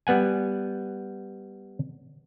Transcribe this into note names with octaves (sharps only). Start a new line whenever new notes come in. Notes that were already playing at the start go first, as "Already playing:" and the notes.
G3 B3 F#5 G#5